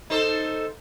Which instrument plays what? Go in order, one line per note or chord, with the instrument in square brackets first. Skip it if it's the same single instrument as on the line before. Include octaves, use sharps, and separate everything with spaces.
[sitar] D#4 A4 C5